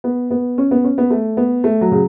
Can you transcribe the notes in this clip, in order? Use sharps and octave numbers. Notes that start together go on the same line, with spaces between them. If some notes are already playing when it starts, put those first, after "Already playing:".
B3
B3
C#4
B3
C#4
B3
A3
B3
A3
F#3
C#3